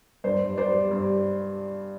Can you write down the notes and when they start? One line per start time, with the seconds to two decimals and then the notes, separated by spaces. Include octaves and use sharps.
0.24 G2 C5 D5
0.41 G2
0.57 G3 C5 D5
0.74 G3
0.91 G2